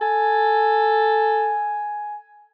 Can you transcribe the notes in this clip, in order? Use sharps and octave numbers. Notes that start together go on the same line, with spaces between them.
A4 G#5